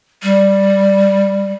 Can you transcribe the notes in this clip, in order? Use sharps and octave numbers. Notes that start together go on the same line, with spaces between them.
G3